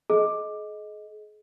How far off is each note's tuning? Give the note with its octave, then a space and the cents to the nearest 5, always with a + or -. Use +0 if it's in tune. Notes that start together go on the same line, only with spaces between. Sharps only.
G#4 +40 D#5 +10